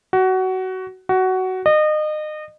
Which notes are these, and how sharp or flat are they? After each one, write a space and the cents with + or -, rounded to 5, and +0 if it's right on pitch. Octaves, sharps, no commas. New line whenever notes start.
F#4 +20
F#4 +15
D#5 -30